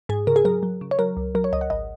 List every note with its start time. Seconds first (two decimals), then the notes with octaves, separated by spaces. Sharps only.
0.09 G#2 G#4
0.27 C#3 A#4
0.36 G#4
0.45 F#3 A#4
0.63 F#3
0.81 C#3
0.91 C#5
0.99 F#3 A#4
1.17 C#2
1.35 F#3 A#4
1.44 C#5
1.53 C#2 D#5
1.61 F#5
1.70 G#1 D#5